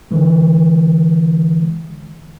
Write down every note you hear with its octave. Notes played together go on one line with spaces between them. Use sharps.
D3 E3 G#3